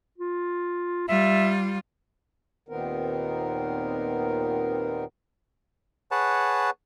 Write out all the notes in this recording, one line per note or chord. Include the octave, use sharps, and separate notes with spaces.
F4
G3 F4 E5
D#2 A#2 D#3 B3 C4 A#4
G#4 B4 C#5 F#5 A5